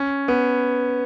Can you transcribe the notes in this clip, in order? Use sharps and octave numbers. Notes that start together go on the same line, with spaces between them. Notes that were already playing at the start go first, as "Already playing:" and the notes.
Already playing: C#4
B3